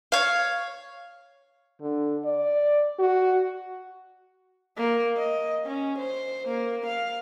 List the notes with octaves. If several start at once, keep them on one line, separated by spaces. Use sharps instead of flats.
C#5 F5
D3
D5
F#4
A#3
D#5
C#4
C5
A#3
F5